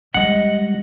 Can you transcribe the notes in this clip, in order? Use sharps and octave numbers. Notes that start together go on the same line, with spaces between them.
G3 G#3 D#5 F#5